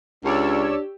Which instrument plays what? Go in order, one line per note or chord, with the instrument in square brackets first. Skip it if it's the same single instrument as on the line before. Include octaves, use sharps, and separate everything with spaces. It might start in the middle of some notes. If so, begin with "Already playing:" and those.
[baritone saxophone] C#2 [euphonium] D4 [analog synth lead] G4 [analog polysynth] C#5 D5 E6